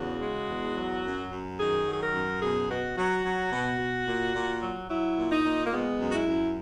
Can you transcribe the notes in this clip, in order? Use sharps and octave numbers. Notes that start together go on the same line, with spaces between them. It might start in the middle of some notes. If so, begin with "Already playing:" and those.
Already playing: E2 C#3 F#4
G#3
E2
F#3
F#2
F#2
D#3 G#4
F#3 G#4
A#4
F#2
B2 G#4
B2 F#4
F#3 F#4
F#3
B2
B2
A#2
A#2
F#3
F#3 E4
A#2
D#4
A#2
A#3
G#3 B3
F#2
F#4
E4
F#2